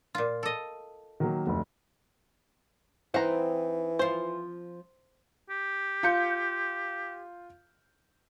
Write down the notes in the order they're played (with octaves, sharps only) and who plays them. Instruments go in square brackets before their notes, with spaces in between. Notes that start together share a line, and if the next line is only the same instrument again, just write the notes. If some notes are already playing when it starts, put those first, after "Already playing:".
[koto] A#2 F4
A4 D#5
[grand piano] D#3 F#3 A#3
F1 D2
[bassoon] E3 [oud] C4 D#4 E4 [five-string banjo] F#5 A#5
[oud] F3 F4 [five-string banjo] C5
[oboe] G4
[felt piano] F4 G6 C#7